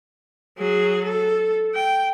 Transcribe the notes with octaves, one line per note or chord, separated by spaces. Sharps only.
F#3 G#4
A4
G5